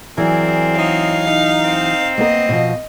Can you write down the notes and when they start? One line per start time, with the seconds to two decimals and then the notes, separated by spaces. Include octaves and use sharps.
0.18 E3 F#3 C4 G#4 A#4 D5
0.78 D#4 C#5 D#5 F5
1.27 D#4
1.64 C4
2.18 A#3 B3 A#4 D#5
2.49 B2 F3